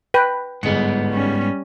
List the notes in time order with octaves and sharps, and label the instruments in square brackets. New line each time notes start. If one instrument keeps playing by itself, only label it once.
[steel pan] B4 G5
[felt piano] G1 G#3 C#7 [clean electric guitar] G#2 B3
[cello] G3 C#4